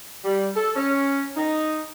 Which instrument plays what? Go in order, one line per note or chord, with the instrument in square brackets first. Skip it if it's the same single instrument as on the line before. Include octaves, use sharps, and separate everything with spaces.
[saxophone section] G3
A4
C#4
D#4